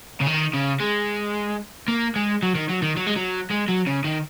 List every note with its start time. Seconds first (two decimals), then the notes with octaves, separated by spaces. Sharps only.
0.21 C#3
0.27 D#3
0.54 C#3
0.80 G#3
1.88 A#3
2.16 G#3
2.43 F#3
2.55 D#3
2.69 F#3
2.83 D#3
2.97 F#3
3.07 G#3
3.16 F#3
3.50 G#3
3.68 F#3
3.86 C#3
4.04 D#3